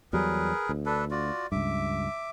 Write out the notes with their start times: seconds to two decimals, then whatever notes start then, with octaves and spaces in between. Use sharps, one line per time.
0.13 E2 F#3 G3 G#4 A#4 B4
0.69 D2
0.86 D4 A4 B4
1.11 F4 F#4 D5
1.52 C#2 G2 E5 D6